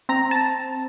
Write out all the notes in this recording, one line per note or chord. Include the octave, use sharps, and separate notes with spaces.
C4 A#5
A5